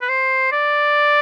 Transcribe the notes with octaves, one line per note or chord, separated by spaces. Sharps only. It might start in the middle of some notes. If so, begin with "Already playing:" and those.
B4
C5
D5